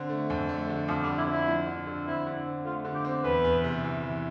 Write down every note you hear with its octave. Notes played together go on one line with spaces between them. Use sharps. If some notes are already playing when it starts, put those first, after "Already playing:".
Already playing: D3 C4
A3
F2
A3
D3
F2 F3
G3
D3
E4
F3
E4
F3
D3
D3
C4 E4
D3
C4
A3 F4
D3
G4
C4
E2 B4
E2
C3
E3
E3